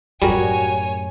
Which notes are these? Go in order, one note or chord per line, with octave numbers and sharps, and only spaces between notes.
F#2 A2 G3 F#4 G#4 A#4 C#5 G#5